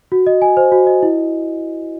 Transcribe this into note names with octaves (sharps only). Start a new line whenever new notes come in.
F#4
D#5
G#5
C5
F#4
D#5
E4